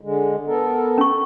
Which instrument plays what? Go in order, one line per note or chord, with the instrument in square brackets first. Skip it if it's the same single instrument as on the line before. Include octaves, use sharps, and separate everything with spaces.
[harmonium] D3 G#3
B3 A4 A#4
[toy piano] C#4 C#6